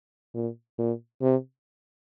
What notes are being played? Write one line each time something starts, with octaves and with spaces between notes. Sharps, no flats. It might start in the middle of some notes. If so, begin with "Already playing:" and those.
A#2
A#2
C3